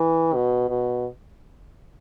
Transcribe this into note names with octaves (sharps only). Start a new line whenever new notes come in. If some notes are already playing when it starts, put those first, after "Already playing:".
Already playing: E3
B2
B2